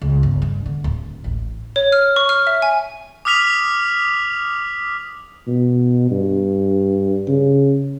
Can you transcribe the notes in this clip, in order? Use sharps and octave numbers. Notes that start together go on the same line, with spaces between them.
C#2
G1
G2
D3
D1
A1
C#5
F6
C#6
F6
E5
G#5
D6 D#6 F6 B6 F7
B2
G2
C#3